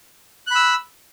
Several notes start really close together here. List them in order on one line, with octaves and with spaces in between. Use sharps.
F#6 B5 E6